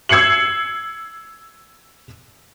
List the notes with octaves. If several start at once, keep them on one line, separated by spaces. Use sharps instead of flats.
E6 G#6 C7 C#7 F#7